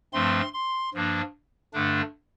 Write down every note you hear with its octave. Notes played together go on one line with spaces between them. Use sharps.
G2 F3 A3 C4 C6
C6
G2 F3 A#3 D4
G2 D3 A3 D4